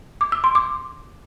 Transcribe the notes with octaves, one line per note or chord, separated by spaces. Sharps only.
D6
E6
C6
D6